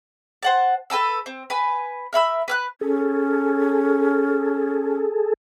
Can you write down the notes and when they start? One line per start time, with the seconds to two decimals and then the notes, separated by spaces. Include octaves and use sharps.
0.43 C5 F#5 A5
0.90 A4 B4 A5 E6
1.26 C4
1.50 B4 G#5
2.13 A#4 E5 B5 E6
2.48 B4 F6 F#6
2.81 C#4 G#4 A4